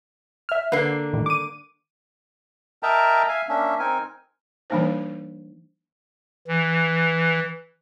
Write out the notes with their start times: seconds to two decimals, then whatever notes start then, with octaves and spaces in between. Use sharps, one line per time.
0.49 E5 F6
0.72 D3 A#3 B4 C7
1.13 A2 D#3 G3
1.26 D6 D#7
2.83 A#4 D#5 E5 G5 A5 A#5
3.29 E5 F5 G#5
3.49 A#3 C#4 D4 E5
3.79 C4 D#4 A#4 G#5
4.70 E3 G3 A#3 D4 D#4 C5
6.47 E3